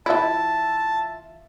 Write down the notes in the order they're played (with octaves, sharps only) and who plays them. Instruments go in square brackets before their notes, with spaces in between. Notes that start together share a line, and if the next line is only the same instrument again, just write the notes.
[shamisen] E3 E4 [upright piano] F4 E5 [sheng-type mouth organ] A5